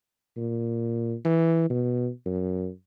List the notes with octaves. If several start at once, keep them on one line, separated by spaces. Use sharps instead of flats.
A#2
E3
B2
F#2